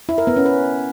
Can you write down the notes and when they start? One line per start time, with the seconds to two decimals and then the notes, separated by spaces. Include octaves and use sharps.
0.09 E4
0.18 A#4
0.27 B3
0.36 C#4
0.46 B4